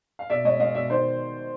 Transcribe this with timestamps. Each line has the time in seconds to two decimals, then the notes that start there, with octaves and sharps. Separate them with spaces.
0.19 F5
0.30 B2 D5 E5
0.45 G#3 C#5 D#5
0.60 G#3 D#5 F5
0.75 B2 D5 E5
0.90 D#3 C5 D5